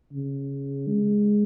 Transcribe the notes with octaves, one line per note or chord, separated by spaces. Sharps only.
C#3
G#3